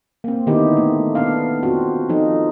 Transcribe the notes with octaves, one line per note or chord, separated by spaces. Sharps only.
A#3 C4
D3 D#3 B3 D#4 E4 G4
A3
B3 D4 F5
C4 F4 F#4
F3 D#4 A4